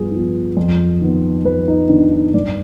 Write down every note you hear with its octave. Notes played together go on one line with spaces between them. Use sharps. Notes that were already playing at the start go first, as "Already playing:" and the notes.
Already playing: G2 F3 B3 G#4
F3 B3
F2
D#3 B3
F2 B4
D#4
D#3 B3 D4
D#4
G2 D5